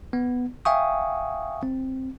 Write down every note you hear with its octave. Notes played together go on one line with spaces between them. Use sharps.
B3
E5 F5 G5 G#5 C#6 D#6
C4